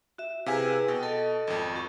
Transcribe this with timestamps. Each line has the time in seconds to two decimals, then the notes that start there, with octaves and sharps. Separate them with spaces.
0.18 F#4 E5
0.46 C3 E4 G#4 B4 F5 G#5
0.88 B2 G5
1.03 A4 D#5 A5
1.47 G#1 F2
1.71 F#4 A#4 C#6